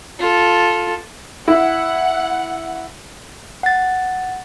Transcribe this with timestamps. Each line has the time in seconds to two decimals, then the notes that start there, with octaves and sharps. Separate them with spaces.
0.20 F4 A4
1.48 E4 F#5
3.63 F#5 A6